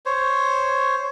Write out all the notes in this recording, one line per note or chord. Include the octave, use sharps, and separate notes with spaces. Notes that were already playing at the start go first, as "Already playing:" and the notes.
C5 C#5